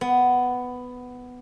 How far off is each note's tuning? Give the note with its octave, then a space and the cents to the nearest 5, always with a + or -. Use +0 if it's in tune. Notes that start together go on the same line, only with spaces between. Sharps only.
B3 +10